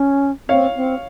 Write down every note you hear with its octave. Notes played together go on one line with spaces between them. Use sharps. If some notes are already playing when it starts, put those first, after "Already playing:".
Already playing: C#4
C4 C#5 F5
C4